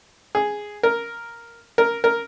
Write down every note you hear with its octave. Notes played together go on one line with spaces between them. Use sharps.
G#4
A#4
A#4
A#4